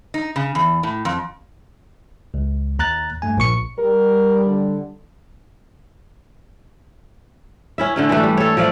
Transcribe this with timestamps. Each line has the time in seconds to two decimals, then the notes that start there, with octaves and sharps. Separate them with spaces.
0.14 D#4
0.36 C#3
0.55 E2
0.83 A2
1.05 F2
2.34 C#2
2.79 D#2 A#5 F#6 A6
3.22 G2 A3 G#5
3.37 A#1 A#2 C#6 C#7
3.78 G3 A#4
4.46 D3
7.78 C#4 E4 E5
7.96 D3 A3 C#4
8.09 E3 G3 A3 D4
8.23 G3
8.37 A4 C#5
8.57 F3 A3 D5 F5